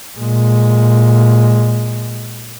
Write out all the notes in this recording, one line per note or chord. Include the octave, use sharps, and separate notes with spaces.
A#2 G#3